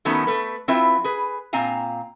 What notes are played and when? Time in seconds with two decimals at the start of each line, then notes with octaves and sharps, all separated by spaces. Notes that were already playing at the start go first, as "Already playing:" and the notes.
0.05 D#3 F#3 A3 B3 C#4
0.27 A3 B4
0.68 F#3 C4 E4 F4 B4 E5
1.04 G#4 B4
1.53 A#2 C4 F5 G#5 A#5